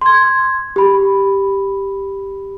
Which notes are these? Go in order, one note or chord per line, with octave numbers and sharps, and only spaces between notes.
C6 G#6
G4 B5